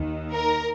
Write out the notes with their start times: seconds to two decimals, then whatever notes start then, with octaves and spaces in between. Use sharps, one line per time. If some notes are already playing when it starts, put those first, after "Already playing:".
Already playing: D#2 D#3
0.33 A#4